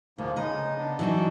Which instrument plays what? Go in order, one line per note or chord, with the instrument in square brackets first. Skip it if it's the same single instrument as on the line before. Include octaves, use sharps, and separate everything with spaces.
[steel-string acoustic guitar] D2 [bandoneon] G#2 F3 A#3
[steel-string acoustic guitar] C#3 D#5 [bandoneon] G#3 D#4
[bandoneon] B3 D4
[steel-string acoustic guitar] E3 F#3 D#4